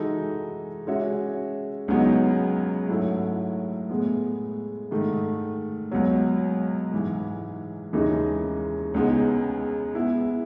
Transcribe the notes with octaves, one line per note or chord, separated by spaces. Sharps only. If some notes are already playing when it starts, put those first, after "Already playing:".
Already playing: E3 G#3 D#4 F#4 A4
G#3 C#4 F#4 C#5 E5
C#2 C#3 F#3 B3 D#4
G#2 F#3 A3 E4
A2 G#3 B3
G#2 D#3 A3
C#2 B2 F#3
G#2 E3 G#3
D#2 C#3 E3 G#3 D#4
C#2 C#3 G#3 B3 D#4
G#3 B3 E4